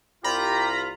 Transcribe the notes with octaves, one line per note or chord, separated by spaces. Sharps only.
C2 F4 G4 A#5 B5